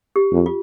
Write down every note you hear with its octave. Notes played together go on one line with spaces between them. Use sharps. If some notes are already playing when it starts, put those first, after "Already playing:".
G4
F2
F4